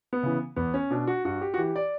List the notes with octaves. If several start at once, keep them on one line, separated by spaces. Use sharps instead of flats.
B3
C#3 E3
E2 B3
C#4
B2 D4
F#4
G2 F#4
G4
F#4
E3 G4
D5